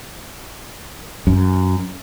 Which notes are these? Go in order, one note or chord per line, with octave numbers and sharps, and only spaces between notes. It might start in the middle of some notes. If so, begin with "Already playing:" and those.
F#2